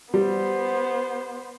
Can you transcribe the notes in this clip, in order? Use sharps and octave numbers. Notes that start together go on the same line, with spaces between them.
G3 B3 C5